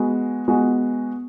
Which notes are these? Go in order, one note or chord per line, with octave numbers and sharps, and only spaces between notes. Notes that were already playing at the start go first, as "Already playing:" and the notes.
Already playing: G#3 B3 F#4
G#3 B3 F#4